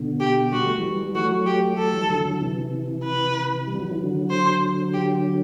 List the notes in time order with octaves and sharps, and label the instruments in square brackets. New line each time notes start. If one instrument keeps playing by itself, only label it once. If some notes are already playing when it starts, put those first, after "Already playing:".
Already playing: [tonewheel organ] B2 D3
[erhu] G4
[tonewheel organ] G3 [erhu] F#4
[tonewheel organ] A3
E3 G3
G3
[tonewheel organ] F#3 A3 [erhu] F#4
[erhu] G4
[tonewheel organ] F#3 A3 [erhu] A4
[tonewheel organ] E3 G3
D3 F#3
D3 F#3
C3 E3
[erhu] B4
[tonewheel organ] G3
F#3
E3
D3 F#3
[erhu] C5
G4